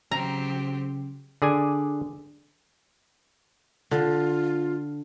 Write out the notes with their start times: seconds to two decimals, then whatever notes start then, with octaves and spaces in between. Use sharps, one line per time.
0.11 C#3 F#3 C4 G4 A#5
1.42 D3 G#4 D5 G#5
3.91 D3 F4